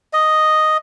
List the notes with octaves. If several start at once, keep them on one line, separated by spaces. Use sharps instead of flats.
D#5